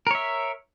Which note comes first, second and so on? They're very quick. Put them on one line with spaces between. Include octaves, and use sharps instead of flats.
A#4 C#5 E5